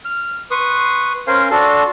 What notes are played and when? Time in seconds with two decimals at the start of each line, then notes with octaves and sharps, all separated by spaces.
0.05 F6
0.51 B4 C6 C#6 D#6
1.27 C#4 A#4 C5 F5 G#5 C6
1.51 D4 F#4 A4 A5 C6